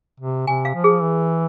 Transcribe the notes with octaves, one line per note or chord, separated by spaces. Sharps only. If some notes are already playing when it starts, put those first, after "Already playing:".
C3
C3 G#5
F5
F3
G#4
E3